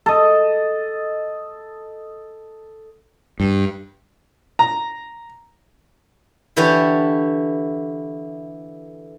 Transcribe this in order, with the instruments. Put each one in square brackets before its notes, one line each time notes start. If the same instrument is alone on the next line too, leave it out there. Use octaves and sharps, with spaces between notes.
[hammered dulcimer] A4 D#5
[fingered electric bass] G2
[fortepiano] A#5
[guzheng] D3 E3 E4 G4 A4 C#5